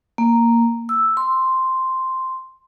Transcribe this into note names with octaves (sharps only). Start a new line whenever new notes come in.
A#3
E6
C6